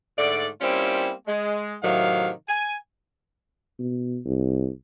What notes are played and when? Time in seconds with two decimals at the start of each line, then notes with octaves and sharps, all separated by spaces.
0.18 G#2 D3 A3 D5
0.61 G3 A#3 C4 C#4 E4 F4
1.27 G#3
1.82 A2 C3 D#3 F#3 F5
2.49 G#5
3.79 B2
4.25 C2